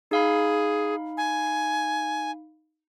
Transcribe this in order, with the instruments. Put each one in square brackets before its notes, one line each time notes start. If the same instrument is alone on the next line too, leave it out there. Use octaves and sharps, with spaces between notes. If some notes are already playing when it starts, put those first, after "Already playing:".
[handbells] D#4 F5 B5 [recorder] G#4
[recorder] G#5